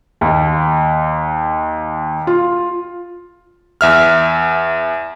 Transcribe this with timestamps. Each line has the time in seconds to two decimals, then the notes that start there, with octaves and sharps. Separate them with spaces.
0.21 D#2
2.27 F4
3.81 E2 E5 F6